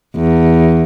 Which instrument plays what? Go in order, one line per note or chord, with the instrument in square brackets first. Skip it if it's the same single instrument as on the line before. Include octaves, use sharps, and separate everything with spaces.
[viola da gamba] E2